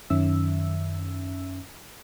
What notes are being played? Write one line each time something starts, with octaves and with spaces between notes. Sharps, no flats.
F#2 D#3 C#4 E5 E6